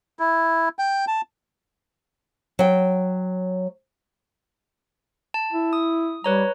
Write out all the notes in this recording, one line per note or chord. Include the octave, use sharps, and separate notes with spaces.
E4
G5
A5
F#3 G5
A5
E4
D#6
G3 B4 C#5 A#5